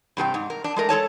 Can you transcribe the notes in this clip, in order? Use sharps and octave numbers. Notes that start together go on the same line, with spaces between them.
G2 C3 G#4 G5
G#2
A#4
D4
G#3 A3 A#4
G#3 A4 C#5 A5